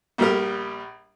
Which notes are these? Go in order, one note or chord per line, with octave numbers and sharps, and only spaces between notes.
A#1 G3 G4 A#4